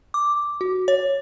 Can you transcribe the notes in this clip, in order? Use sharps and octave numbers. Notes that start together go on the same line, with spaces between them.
D6
F#4
C#5